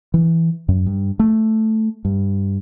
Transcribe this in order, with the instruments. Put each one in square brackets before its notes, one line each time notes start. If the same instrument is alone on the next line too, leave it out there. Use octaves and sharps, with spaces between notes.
[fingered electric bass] E3
F#2
G2
A3
G2